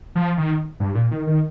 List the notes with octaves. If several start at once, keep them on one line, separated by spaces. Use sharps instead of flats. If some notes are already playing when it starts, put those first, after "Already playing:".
F3
D#3
G2
A#2
D#3
D#3